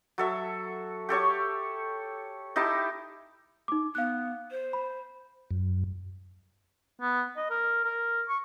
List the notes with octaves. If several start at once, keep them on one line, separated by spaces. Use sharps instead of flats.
F#3 A4 E5
G4 A4 C#5 C#6
D#4 E4 G4 A5
D#4 D6
B3 F5 F#6
C5
B5
F#2
B3
D#5
A#4
A#4
C#6